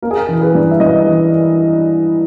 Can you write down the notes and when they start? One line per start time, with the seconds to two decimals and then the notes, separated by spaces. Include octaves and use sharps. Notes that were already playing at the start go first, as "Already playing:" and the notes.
0.02 A#3 A#4
0.11 G#4
0.17 A#4
0.29 E3
0.41 G#4 B4
0.55 G2
0.71 E5
0.80 G2 B4 D#5
1.06 E3